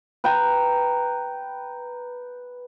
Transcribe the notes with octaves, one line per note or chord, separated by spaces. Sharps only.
B4 G5 A#5